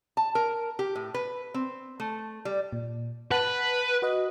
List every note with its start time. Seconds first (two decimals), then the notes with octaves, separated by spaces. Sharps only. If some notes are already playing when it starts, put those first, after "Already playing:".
0.17 A5
0.35 A#4
0.79 G4
0.95 A2
1.14 B4
1.54 C4
2.00 A3
2.45 G3
2.73 A#2
3.32 B4 F#5 A5
4.02 F#4 B4 D#5